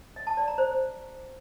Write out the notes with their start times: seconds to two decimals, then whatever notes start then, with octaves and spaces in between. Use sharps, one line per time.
0.16 D#5
0.27 A5
0.37 D5
0.48 A#5
0.58 C5